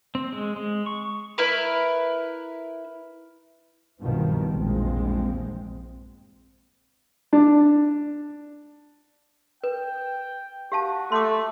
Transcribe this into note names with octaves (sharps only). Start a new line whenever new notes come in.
C4
G#3
G#3
C#6
E4 A#4 B4
C2 G2 B2 D#3 F3
A#1 E2 G2 F3 G#3 C4
D4
B4 G5
F#4 G4 F5 A5
A3 C6 D6